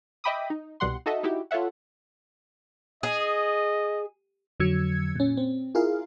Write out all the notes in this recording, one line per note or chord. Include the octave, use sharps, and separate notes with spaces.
D#5 E5 G5 B5 D6 D#6
D#4
C2 B2 G3 F#5 C6
D#4 F#4 A4 D#5 E5
D#4 E4 F#4 G4
F4 A4 C#5 E5 F#5
G#4 D#5
F2 D3 F#3 E6 G#6 C#7
A#2 C#4
C4
E4 F4 G#4 A#4 F5